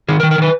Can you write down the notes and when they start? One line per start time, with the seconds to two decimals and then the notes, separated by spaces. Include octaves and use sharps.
0.09 D#3 G#4
0.20 A#4
0.23 D#3
0.31 A#4
0.38 D#3 B4